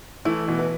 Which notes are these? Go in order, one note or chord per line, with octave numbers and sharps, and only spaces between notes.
E3 A3 E4
B2 E3
B4